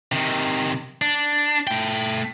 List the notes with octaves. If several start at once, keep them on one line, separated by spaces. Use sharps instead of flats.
C3 D#3
D4
A3 G5